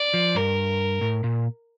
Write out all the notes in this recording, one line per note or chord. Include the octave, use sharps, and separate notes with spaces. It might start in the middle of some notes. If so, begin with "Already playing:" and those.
Already playing: D5
F3
G2 A#4
A2
A#2